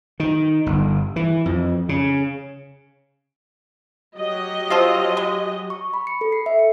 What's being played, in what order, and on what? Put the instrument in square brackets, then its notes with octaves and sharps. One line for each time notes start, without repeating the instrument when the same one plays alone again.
[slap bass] D#3
G1
E3
F2
C#3
[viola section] F#3 G4 D#5
[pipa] F3 C4 F4
G#3
[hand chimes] C#6
B5
C#7
A4
C7
E5
C#7